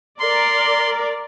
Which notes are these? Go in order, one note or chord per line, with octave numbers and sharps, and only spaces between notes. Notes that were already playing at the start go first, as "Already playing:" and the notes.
A#4 D5 C6